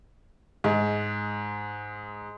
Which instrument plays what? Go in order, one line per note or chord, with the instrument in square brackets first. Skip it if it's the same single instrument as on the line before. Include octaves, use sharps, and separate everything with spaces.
[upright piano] G#2 [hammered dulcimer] G#3